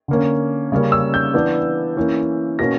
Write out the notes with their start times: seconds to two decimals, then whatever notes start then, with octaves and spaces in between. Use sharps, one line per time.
0.08 D3 A#3 C#4
0.72 C#3 G3 A#3 C#4
0.92 E6
1.14 G6
1.34 E3 B3 D4
1.96 E3 A#3 C#4
2.59 B2 A#3 C#4 A#6